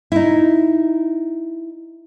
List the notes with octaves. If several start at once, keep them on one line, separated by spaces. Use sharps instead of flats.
D#4 E4